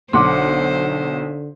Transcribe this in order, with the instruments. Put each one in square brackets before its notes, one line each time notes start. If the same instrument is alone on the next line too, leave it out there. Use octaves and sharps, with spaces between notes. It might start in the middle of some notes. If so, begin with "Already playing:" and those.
[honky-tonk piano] B1 F#5 [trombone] D3 [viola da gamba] C5 [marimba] C6 D6